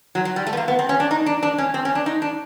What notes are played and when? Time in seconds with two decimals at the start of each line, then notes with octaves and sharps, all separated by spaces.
0.15 F#3
0.25 F#3
0.36 G3
0.47 A3
0.53 B3
0.57 A#3
0.68 B3
0.79 C4
0.89 C#4
1.00 D4
1.11 D#4
1.26 D4
1.43 D4
1.58 C#4
1.74 C4
1.85 C#4
1.95 D4
2.06 D#4
2.22 D4